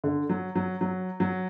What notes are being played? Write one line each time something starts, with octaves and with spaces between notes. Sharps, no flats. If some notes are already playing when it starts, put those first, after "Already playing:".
D3
F#3
F#3
F#3
F#3